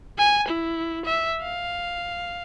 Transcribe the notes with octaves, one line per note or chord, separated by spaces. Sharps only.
G#5
E4
E5
F5